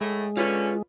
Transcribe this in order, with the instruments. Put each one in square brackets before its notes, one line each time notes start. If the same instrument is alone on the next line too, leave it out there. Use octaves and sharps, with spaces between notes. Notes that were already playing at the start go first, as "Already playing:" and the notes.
[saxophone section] A2 A3 [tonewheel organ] G#3
[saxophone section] D3 C#4 [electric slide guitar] F4 B4 C#5